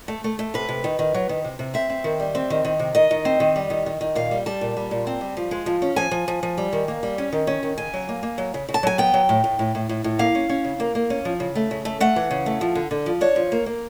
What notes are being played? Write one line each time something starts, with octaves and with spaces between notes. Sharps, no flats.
A3
A3
A3
C3 B4
C3
D#3
D#3
F#3
D#3
C3
C3
C4 E5
C4
D#3
G3
C4
D#3
D#3
C3
D#3 D#5
D#3
C4
D#3
G3
D#3
D#3
D#3
A#2 F5
G3
G3 A5
A#2
G3
A#2
C4
G3
F3
G#3
F3
C#4
F3 G#5
F3
F3
F3
G3
D#3
A#3
G3
C#4
D#3
C#4
D#3
C#3 G#5
F#3
A#3
A#3
F#3
C#3
C#3
A5
F#3 G#5
B3 G5
F#3
A2
A2
A2
A2
A2
A2
A#3 F5
C#4
C#4
C#3
A#3
A#3
C#4
F3
C#3
A3
C#3
A3
A3 F#5
E3
C#3
A3
F3
D3
D3
F3
D4 C#5
F3
A#3
A#3